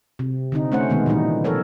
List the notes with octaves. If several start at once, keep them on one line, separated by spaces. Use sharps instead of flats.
C3
D3 C4 D#4
A3 C#4 C5 F#5
B2 D#3 G#3 B3
A#2 E3 G3 D#4
F3 A4 A#4 C#5